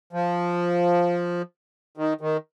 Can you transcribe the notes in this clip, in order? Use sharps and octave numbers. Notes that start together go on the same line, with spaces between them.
F3
D#3
D#3